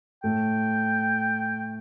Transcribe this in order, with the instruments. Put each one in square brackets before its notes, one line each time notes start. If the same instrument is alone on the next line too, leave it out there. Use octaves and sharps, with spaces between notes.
[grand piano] A2 A3 [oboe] G5